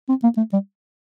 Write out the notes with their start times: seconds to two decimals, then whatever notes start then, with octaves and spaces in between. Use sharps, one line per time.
0.09 C4
0.23 A#3
0.37 A3
0.53 G3